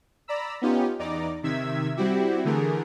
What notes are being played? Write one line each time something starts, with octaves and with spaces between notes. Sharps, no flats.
D5 A#5 B5 E6
B3 C#4 D#4 F4 G4
E2 D#4 D5 A#5 D6
C3 D#3 E5 E6 G#6 B6
G3 C4 E4 F#4 G4
D3 E3 A3 G#4 A#4